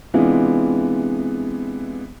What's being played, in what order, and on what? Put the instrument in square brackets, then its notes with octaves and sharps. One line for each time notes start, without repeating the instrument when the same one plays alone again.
[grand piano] C3 E3 G#3 B3 D4 F4